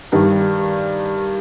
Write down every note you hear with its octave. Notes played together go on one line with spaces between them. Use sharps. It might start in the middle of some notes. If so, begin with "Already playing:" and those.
G2 D#3 G3